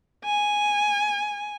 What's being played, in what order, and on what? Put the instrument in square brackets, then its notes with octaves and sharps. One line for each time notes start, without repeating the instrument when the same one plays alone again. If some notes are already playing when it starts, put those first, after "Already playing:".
[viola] G#5